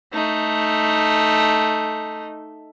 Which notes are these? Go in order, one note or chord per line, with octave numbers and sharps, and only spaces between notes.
A3 D#4